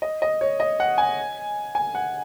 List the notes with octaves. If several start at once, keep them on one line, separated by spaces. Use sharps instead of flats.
D#5
D#5
C#5
D#5
F#5
G#5
G#5
F#5